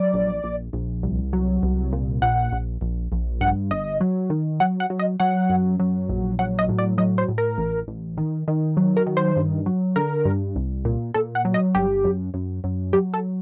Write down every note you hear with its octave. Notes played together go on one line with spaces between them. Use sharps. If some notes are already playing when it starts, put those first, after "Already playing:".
Already playing: F#3 D5
A#1
A#1
A#1
C2
F#3
C2
A#2
A#1 F#5
A#1
A#1
A#1
G2 F#5
G1 D#5
F#3
D#3
F#3 F#5
F#5
F#3
D#5
F#3 F#5
F#2
F#3
A#1
F#3 F#5
D#5
A2
D5
F#3 D#5
C5
A2
A#4
A1
A1
D#3
D#3
F#3
A#4
D#3
C5
G2
F#3
D3 A#4
G2
C2
A#2
A#2 A4
F#5
F#3
D#5
G1 G4
F#2
F#2
F#2
F#3 G4
A4